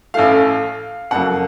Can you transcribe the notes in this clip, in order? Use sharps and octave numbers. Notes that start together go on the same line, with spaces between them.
A1 A2 A3 F5
F#1 F2 C#3 F#3 A#3 F#5